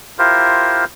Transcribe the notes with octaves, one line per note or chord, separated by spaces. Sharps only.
E4 F4 G4 A#4 C5